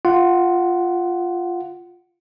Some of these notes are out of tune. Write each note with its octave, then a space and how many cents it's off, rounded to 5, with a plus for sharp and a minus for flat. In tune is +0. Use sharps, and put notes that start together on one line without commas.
F4 +0 F#5 +15